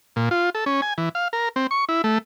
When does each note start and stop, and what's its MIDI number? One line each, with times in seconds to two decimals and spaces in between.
0.16 0.29 46
0.31 0.50 65
0.55 0.65 69
0.66 0.81 61
0.82 0.93 80
0.98 1.09 52
1.15 1.28 77
1.33 1.49 70
1.56 1.67 60
1.71 1.85 85
1.89 2.02 64
2.04 2.18 57